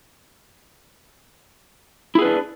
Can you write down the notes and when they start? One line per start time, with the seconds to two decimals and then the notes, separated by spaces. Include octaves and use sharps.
2.15 E4
2.19 G#4
2.22 B4
2.25 D4